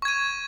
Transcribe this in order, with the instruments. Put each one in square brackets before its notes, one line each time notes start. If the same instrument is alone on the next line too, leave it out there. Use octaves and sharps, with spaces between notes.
[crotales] C#6
G#6
D#7